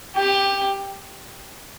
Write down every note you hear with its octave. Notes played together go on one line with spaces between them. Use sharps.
G4